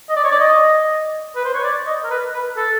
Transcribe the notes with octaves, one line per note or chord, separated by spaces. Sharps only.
D#5
D5
C#5
D5
D#5
B4
C5
C#5
D5
D#5
A#4
B4
B4
A4